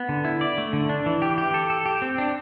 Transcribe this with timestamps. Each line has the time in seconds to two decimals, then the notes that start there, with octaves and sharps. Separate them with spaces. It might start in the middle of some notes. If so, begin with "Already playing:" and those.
Already playing: B3
0.09 D3
0.25 E4
0.41 D5
0.58 A3
0.73 D3
0.89 D4
1.06 E3
1.22 G4
1.38 G4
1.54 A4
1.70 A4
1.86 G4
2.02 C4
2.18 D4